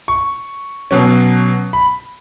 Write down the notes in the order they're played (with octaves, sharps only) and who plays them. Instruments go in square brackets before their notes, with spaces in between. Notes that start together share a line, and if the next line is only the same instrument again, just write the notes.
[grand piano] C#6
B2 F#3 C#4
B5